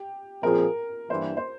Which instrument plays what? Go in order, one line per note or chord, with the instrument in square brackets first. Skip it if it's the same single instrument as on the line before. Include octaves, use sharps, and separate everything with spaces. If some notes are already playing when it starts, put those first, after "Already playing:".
Already playing: [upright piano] G4
[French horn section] A#2 F3 C4 F4 G#4 [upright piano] A#4
[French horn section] G2 E3 A#3 E4 [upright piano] C5
[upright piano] C5